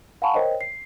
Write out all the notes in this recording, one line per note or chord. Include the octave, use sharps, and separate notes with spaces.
F5 F#5 G#5 A5 B5 C#6
A#4 C5 C#5 D#5 G5
C7